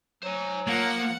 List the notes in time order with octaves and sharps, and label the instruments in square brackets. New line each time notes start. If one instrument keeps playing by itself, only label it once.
[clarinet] F#3 [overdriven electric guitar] C5 G#5
[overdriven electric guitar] F3 F4 [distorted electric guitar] A#3 [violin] F#5